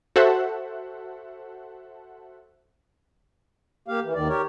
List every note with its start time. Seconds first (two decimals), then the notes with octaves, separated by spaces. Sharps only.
0.16 F#4 A4 C5 E5 F#5
3.88 A#3 G4 F5
4.03 E3
4.15 D#2 D#3 D5
4.29 G4 A#4 C#5